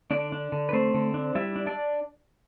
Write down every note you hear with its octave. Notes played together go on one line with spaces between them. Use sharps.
D3 D4 D5
D4
D3
B4
A3 C4 C5
D3
D4
G3 E4 E5
D4
D4 D5